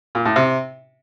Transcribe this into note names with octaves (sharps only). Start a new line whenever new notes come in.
A#2
A2
C3